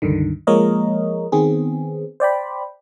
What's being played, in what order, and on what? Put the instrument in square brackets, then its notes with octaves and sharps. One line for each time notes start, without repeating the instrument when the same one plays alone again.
[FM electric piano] C#2 G2 D3 D#3
F3 G#3 A#3 A#4 C#5 D#5
D#3 B3 C4 G#4
C5 D5 G5 B5